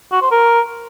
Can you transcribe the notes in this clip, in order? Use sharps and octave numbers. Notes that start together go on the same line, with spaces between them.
F#4
C5
A#4